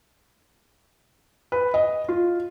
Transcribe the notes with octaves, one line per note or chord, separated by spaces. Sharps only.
B4
D#5
F4